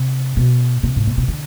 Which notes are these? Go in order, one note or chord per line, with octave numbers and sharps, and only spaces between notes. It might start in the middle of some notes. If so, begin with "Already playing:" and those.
Already playing: C3
B2
C3
G#2
B2
C3
D3